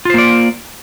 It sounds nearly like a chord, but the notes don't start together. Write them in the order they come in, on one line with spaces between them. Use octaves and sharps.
F4 C5 A#3 D5